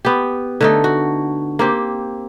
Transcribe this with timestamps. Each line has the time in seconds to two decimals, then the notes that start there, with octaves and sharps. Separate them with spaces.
0.05 B3 G4
0.61 D3 A3 D#4
0.84 F#4
1.59 A#3 C4 G4